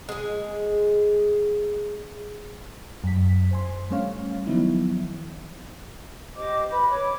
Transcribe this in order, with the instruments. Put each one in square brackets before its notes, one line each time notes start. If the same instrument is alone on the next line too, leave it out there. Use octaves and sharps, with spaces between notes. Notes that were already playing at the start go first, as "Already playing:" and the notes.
[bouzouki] G#3 G#4
[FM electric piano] F#2 B6
C5 G#5 C6
G3 A3 C#4 C#5 F5
D#3 F3 F#3 B3 D#4 E4
[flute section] G4 C5 D#5 D6
B4 B5
C#5 D6